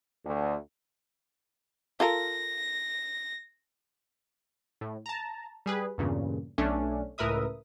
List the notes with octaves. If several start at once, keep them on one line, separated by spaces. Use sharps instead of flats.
D2
F4 A4 A#4 A#6
A2
A5 A#5
G3 G#4 B4
E2 G2 A#2 C#3
B1 A3 C#4 D4
C#2 A2 A#4 B4 E5 D#6